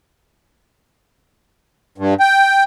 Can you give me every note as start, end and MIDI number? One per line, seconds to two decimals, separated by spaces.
1.98 2.14 43
2.20 2.64 79